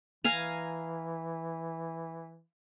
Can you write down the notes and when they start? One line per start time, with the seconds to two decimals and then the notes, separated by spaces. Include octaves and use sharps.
0.24 E3 F5 G#5 A#5